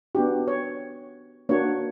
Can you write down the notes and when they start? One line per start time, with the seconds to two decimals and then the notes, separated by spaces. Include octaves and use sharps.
0.15 B3 D4 F#4 G4
0.48 C#5
1.49 A#3 D4 F#4 C#5